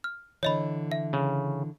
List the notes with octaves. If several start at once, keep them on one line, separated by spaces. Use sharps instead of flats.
F6
D3 E3 C#5 D#5 B5
E5
C#3